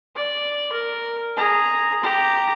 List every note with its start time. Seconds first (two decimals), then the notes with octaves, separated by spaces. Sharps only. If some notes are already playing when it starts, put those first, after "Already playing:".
0.15 D5
0.72 A#4
1.36 G#4 A#5
2.03 G4 A#5